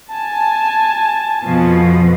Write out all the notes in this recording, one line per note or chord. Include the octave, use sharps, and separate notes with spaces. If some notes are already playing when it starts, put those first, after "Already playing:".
G#5 A5
F2 B2 F3